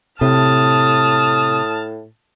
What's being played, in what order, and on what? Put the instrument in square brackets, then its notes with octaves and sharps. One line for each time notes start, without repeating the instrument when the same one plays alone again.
[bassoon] A2 [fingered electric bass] C3 [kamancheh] A5 F6 [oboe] D#6